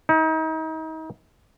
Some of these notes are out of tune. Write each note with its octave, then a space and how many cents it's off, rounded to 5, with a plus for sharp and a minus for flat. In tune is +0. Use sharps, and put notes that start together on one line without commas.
D#4 +35